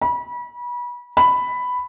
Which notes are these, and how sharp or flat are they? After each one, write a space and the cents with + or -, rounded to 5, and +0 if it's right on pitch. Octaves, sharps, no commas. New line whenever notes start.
B5 -30
B5 +10